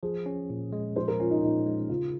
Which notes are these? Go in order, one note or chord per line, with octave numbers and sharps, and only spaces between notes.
F3 G#4
C#4
A#2
G#3
F3 C5
A#4
C#4 F4
D#4
F4
A#2 D#4
G#3
C#3 F4